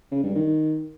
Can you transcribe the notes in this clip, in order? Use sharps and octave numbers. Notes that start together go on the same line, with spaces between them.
C#3
G2
D#3